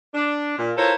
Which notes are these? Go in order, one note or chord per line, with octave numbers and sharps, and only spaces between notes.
D4
A#2
E4 F4 A4 A#4 C5 C#5